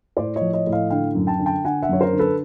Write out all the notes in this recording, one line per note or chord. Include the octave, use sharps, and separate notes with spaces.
A2 C5 D5
C#5 D#5
F3
C#5 D#5
A2
D#5 F5
D3 F5 G5
F#2
G5 A5
D3
G5 A5
D3 F#5 G#5
E5 F#5
F#2 C#5
A#4 C5
D3
A4 B4